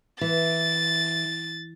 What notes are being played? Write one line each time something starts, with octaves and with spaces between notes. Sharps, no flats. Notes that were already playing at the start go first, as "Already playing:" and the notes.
E3 A6